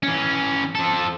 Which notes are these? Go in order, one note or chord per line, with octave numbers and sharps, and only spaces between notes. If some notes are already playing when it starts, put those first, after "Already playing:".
E3 C#4
F3 A4